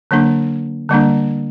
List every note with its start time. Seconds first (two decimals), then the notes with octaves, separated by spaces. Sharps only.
0.11 D3 F#3 A#3 D4
0.89 D3 G3 A#3 D4